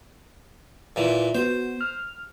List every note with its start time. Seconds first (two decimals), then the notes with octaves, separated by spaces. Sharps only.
0.96 A#2 E3
1.35 B3 F#4 C5
1.81 F6